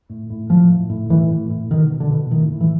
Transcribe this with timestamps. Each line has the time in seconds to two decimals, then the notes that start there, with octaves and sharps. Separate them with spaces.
0.10 A2
0.30 A2
0.50 A2 F3
0.70 A2
0.90 A2
1.10 A2 E3
1.31 A2
1.50 A2
1.71 B2 D#3
1.90 B2
2.00 D3
2.10 B2
2.31 A2 D#3
2.51 A2
2.61 E3